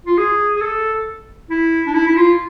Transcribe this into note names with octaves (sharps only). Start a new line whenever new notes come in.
F4
G#4
G#4
A4
E4
D4
E4
E4
F4